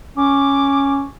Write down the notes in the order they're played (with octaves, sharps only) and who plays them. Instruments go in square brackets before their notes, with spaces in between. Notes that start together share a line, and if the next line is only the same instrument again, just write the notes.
[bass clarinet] C#4 [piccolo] D6